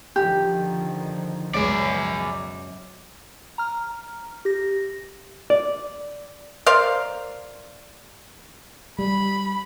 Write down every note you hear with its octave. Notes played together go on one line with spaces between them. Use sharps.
D3 D#3 F3 G4
C#2 F#2 B2 F#3 G#3 G#4 D5
A#5 F6
G4 A#6
D5
A#4 C5 D5 F5
G3 B5